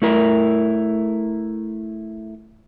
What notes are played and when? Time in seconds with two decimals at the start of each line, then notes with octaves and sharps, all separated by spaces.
0.02 A3 E4 A#4